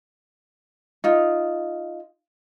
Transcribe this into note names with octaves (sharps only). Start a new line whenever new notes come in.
D#4 F4